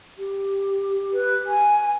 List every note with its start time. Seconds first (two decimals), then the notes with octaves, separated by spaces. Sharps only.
0.19 G4
1.13 B4
1.47 G#5